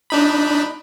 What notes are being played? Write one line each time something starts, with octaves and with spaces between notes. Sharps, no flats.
D4 D#4 B5